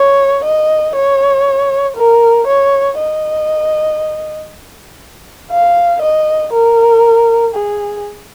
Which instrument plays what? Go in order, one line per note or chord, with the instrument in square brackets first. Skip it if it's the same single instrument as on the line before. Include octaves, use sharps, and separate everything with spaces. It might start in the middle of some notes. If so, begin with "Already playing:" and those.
Already playing: [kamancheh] C#5
D#5
C#5
A#4
C#5
D#5
F5
D#5
A#4
G#4